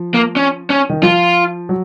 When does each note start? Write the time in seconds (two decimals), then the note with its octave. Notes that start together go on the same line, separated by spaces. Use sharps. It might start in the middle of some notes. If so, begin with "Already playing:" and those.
Already playing: F3
0.14 A#3
0.36 C#4
0.70 C#4
0.90 D#3
1.03 F3 F4
1.69 F#3